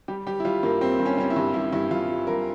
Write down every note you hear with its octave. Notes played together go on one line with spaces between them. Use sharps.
G3 G4
G3 G4
E4
G3 F4
G2 A#3
G3 C4
G2
C#4
G3 C#4
E4
G2
G2 E4
G2 E4
G2 F4
G3
G2 A#4